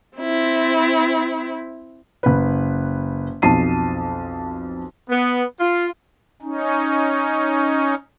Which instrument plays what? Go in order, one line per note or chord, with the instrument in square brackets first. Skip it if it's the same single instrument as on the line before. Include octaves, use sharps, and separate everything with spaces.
[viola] C4 E4
[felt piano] F#1 B4
B1 F2 A5 C7 D#7
[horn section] B3
F4
[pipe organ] C#4 D#4